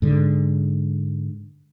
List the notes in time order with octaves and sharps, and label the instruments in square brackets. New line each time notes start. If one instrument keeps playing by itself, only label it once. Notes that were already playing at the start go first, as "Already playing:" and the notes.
[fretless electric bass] G#2 D3